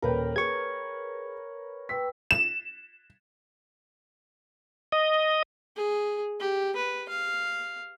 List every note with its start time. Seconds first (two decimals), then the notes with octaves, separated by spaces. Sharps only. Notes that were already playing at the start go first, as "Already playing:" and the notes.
0.02 D#1 A#4 B4 C#5 G5
0.36 G#4 C#6 G#6
1.89 B4 G5 E6 B6
2.31 E7
4.92 D#5
5.77 G#4
6.40 G4
6.76 B4
7.09 F5